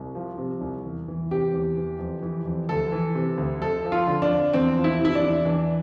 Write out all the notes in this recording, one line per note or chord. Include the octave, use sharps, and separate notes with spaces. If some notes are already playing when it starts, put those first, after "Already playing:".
Already playing: C2
F3
C3
C2
E2
E3
C3 G4
E2
E3
F2
E3
F2
D2 A4
E3
C3
D2
F2 A4
F3
F4
D3
D4
F2
E2 C4
F3
E4
C3
E4
D4
E2
E3 D4